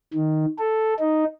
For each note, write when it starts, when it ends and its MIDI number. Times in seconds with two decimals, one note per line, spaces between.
0.13 0.45 51
0.59 0.94 69
1.00 1.25 63